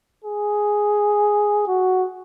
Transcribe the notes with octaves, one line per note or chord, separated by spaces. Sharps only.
G#4
F#4